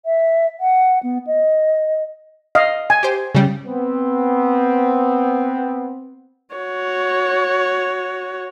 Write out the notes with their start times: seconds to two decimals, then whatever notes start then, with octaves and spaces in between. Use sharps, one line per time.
0.06 E5
0.60 F#5
1.03 B3
1.27 D#5
2.55 D#5 F5
2.90 G#5
3.03 G4 C5
3.35 C#3 G3
3.66 B3 C4
6.55 F#4 C#5